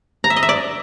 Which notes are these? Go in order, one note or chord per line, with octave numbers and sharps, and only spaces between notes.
A#5
E5
D#5
E5
D5